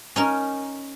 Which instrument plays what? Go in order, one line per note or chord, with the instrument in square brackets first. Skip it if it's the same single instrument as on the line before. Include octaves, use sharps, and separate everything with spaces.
[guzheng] C#4 D#4 A#4